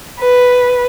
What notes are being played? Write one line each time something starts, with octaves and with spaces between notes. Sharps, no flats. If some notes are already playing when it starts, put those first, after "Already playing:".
B4